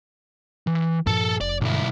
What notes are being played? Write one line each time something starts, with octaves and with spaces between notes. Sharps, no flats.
E3
G2 A#2 F3 A4 A5
F1 D5
B1 G2 D3 E4